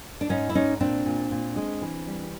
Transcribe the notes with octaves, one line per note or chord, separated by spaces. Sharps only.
D4
G#2 C#4 D#4
E4
G#2 C#4 D#4
A#2 C4 D4
A#2
A#2
G#3
E3
G3